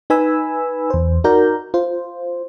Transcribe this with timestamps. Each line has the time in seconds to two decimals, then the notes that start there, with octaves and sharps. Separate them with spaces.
0.10 D#4 B4 G#5 B5 E6
0.90 E2 C5
1.24 D#4 F#4 A#4 D5 A#5 G6
1.74 F4 C5